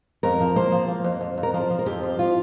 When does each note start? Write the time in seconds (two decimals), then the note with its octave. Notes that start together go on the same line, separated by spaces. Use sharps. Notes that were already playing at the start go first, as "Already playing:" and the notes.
0.23 F2 A#4
0.40 F3
0.56 A#3 C5
0.72 F3
0.88 A#3
1.04 F2
1.21 F2
1.38 F2
1.43 A#4
1.53 F3 C5
1.70 F3
1.79 A#4
1.86 F2 G4
2.03 F3
2.19 F4